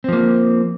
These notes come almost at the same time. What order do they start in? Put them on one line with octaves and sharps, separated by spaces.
C4 F3 A#3